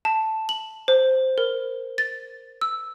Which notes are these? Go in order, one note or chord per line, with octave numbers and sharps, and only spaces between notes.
A5
F#7
C5
A#4
A6
E6